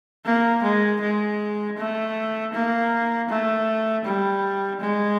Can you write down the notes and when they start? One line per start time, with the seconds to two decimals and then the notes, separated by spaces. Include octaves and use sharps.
0.26 A#3
0.63 G#3
1.02 G#3
1.77 A3
2.53 A#3
3.29 A3
4.05 G3
4.81 G#3